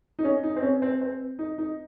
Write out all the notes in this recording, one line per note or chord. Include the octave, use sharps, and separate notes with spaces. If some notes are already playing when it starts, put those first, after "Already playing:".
D#4
C#4
D#4
C4
C#4
C4
C4
D#4
D#4